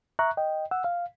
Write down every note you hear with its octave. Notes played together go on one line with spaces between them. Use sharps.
E5 A#5 C#6 F#6
D#5 G5
F#5 E6
F5